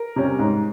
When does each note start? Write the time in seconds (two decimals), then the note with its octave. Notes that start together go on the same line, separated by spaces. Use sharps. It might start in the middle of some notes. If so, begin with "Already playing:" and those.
Already playing: A#4
0.16 C3 G3 C#4
0.39 G#2